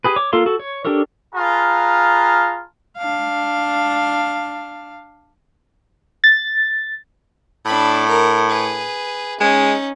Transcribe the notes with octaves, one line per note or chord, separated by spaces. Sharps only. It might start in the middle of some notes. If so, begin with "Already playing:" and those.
G4 G#4 B4
C#5 D6
A#3 F4 A4 F5 C6
F#4 A4
C#5
D4 G4 A4 A#4 C#5
F4 G#4 B4 F5 A5 A#5
D4 F5
A6
A2 D4 B5
A#4
G#4 B4
G#3 C#4 D#4